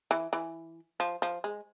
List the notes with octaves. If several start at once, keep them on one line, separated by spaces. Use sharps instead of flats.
E3
E3
F3
F3
G#3